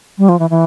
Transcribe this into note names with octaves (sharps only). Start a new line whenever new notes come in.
G3
F3
E3
E3